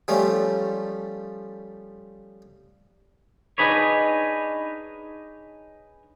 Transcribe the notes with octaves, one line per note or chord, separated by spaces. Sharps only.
F3 G3 A3 C#4
D4 D#4 G#4 B4 C#5